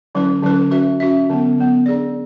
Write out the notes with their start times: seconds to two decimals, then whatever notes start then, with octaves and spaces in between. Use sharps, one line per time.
0.15 D3 F#3 C#4 E4 B4
0.42 D3 F#3 C#4 E4 B4
0.71 C#4 F#4 B4 E5
1.00 C#4 F#4 B4 E5
1.29 D3 F#3 B3
1.57 D3 F#3 B3
1.86 D4 G#4 D5